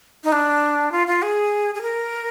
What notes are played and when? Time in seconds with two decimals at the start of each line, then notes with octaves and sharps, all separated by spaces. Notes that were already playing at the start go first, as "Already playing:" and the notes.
0.24 D#4
0.32 D4
0.92 F4
1.07 F4
1.22 G#4
1.75 G#4
1.82 A#4